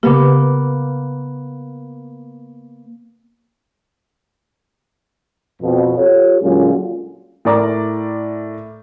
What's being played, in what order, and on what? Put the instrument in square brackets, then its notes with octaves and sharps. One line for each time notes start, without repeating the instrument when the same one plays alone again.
[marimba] C#3 G4 [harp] A#3 B3 D6
[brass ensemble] F2 B2
F4 G4 A4 C#5
A#2 D3 F#3 G#3 C#4 F4
[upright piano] A2 A#4 D5 A#5 D6